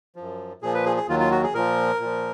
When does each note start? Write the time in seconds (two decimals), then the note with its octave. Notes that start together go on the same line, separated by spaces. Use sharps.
0.16 F#2 F3
0.62 A#2 F3 G#4
0.74 B4
0.86 G#4
0.97 G#4
1.08 D#2 D#3 F#3 F4
1.20 F4
1.31 F#4
1.43 G#4
1.54 A#2 F3 A#4
2.00 A#2 F3